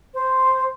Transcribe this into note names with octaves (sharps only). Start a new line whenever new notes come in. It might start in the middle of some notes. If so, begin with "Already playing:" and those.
C5